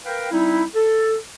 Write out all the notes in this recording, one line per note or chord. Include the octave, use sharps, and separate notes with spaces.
A#4 B4 F5 G5
G3 C4 D#4 E4
A4